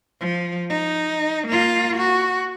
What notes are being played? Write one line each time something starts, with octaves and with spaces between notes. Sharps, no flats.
F3
D#4
A#3 F4
F#4